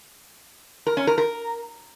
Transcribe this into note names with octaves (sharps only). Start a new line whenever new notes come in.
A#4
C#4
A#4
A#4